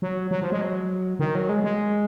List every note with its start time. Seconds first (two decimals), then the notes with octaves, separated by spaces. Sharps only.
0.02 F#3
0.31 F#3
0.42 F3
0.52 G#3
0.61 F#3
1.19 D#3
1.35 F#3
1.49 G#3
1.64 G#3